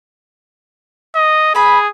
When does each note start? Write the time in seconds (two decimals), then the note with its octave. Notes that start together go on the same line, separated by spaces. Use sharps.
1.15 D#5
1.55 G#4 B4 B5